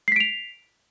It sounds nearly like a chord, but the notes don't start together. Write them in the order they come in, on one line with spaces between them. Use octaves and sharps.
C7 B6 D7 F7